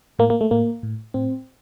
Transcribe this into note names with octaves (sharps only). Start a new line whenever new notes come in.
A2 A#3
A#3
A3
A2 A#3
A2
A2 C4